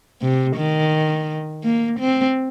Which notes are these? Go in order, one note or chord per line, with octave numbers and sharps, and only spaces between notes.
C3
D#3
A#3
C4